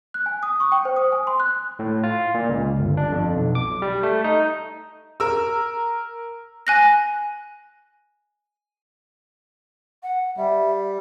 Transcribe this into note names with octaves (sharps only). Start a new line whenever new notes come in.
F#6
G#5
D#6
C#6
G5
C5
D#6
G#5
C6
F#6
A2
F4
A#2
C#2
G1
D4
F2
B1
D6
G3
A3
D#4
A#4 E6
G#5 F#6 A#6
F#5
G3 E5